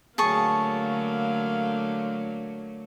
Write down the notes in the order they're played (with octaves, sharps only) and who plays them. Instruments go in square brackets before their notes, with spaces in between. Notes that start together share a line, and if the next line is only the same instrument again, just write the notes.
[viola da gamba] D3 F#3 A3 [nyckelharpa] A#3 F5 [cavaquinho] G#4 A5 C#6